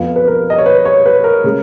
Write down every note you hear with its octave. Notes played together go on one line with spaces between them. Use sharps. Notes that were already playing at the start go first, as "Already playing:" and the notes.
Already playing: F2 F3 B3 F5
B4
A#4
D#5
C#5
B4
C#5
B4
A#4
C#3 G#3